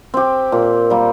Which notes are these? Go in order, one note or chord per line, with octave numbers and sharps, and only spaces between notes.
C4 G4
A#2
G3 A#3